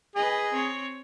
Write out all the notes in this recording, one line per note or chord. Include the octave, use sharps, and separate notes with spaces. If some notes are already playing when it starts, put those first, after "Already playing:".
G#4 B4 D#5
C4 C#5